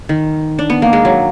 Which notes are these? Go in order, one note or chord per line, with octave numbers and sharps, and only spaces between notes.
D#3
D4
B3
A#3
G#3
F#3